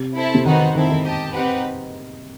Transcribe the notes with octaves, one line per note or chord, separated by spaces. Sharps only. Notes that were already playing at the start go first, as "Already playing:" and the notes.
Already playing: C3
E4 A4 C5 E5 A5
C3
D#3 B3 D#4 F#4 C5 F#5
D#3
D#3 C4 E4 A4 E5
D#3
G4 D#5 A5
C4 D#4 G4 B4 F#5